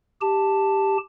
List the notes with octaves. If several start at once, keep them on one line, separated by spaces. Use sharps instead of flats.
G4 A5